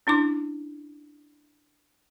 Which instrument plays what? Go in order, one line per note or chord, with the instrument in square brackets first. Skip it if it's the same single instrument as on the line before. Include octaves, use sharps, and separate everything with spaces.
[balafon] C#4 D4 E4 D6